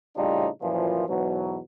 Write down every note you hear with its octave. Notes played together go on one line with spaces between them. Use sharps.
A2 C#3 G3 D4 D#4 F4
F#2 A#2 E3 F3
E2 G#2 B2 F#3